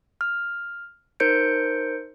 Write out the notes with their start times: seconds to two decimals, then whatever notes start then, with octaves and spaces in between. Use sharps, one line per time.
0.21 F6
1.20 D#4 A#4 C5 G6 C#7 D7